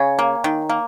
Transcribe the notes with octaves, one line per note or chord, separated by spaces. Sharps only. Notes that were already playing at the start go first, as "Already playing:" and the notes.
Already playing: C#3 G#4 C#5
A#3
D#3
A#3